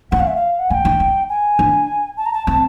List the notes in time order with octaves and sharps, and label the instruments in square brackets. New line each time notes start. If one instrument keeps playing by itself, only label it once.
[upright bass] C#4 [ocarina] F#5
[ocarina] F5
E5
F5
F#5
[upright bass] C#4 [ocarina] G#5
[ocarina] G5
[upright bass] D4
D4
[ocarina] G#5
[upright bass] D4
[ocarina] A5
A#5
A5
[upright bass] C4 [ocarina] A5